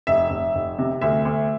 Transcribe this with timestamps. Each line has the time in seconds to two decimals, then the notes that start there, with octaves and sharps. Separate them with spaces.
0.07 F1 E5
0.30 F1
0.55 F1
0.78 C3
1.01 D2 E5
1.25 D2